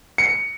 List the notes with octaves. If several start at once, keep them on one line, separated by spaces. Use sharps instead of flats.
C#7